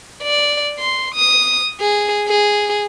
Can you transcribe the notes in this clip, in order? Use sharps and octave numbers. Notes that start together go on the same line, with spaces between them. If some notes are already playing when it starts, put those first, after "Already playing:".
D5
C6
D#6
G#4
G#4